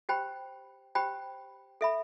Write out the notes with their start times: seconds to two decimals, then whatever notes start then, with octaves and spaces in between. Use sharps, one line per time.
0.09 G4 C5 G5 B5
0.95 G4 C5 G5 B5
1.81 A4 E5 B5